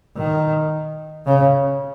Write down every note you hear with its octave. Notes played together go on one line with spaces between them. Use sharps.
D#3
C#3